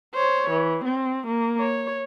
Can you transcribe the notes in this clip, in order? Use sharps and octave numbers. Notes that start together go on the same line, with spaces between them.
C5 C#5
E3
C4
A#3
C#5